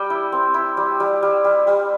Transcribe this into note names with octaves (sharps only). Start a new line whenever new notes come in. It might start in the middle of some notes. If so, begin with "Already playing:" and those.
Already playing: G3 G5
E4
C4
E4
G3
G3
G3
G3
G3